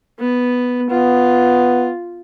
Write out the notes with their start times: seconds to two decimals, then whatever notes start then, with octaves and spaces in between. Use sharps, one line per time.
0.19 B3
0.90 B3 F4